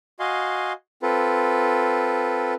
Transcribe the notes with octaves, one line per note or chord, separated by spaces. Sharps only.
F#4 D#5 F5 G#5 C6
C4 F4 A4 B4